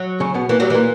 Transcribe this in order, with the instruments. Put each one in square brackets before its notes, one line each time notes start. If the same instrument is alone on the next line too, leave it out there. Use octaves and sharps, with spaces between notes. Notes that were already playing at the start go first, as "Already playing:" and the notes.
Already playing: [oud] F#3
[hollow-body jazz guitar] C#3 C#4
B2 B3
[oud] E3 [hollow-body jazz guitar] A#3
[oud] F#3 [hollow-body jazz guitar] G3
[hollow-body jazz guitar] A#2 A#3 [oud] E3